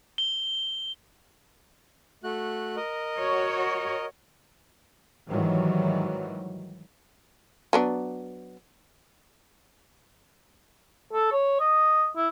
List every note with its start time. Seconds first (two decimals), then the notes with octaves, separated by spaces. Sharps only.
0.18 G7
2.24 A3 F#4 F#6
2.76 A#4 D#5
3.18 F#4 C#5
5.30 G#2 D#3 E3 F#3 G3
7.73 F#3 B3 D4
11.13 A4
11.32 C#5
11.60 D#5
12.17 E4